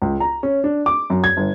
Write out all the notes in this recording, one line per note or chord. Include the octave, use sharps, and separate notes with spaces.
C#2
A#5
C#4
D4
D6
F#2
G#6
G1